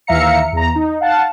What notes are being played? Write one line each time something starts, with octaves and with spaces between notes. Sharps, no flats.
D#2 E3 E5 F5 A#5 C#7
E2 A#5
D#4
F5 F#5 A5